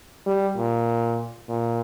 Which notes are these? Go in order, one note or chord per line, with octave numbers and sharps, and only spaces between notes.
G3
A#2
A#2